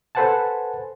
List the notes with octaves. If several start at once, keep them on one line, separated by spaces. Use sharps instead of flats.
A4 B4 C5 F#5 G#5 A5